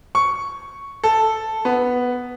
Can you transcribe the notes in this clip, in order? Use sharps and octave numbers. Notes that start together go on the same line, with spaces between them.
C#6
A4
B3